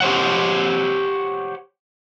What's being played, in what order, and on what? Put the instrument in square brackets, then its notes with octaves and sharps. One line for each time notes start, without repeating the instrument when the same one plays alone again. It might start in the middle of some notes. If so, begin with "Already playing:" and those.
[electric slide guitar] G4 C5 C#5 F#5